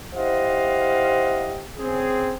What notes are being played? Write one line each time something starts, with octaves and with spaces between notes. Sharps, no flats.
E4 G4 C5 D#5 F5 F#5
C#3 C4 G#4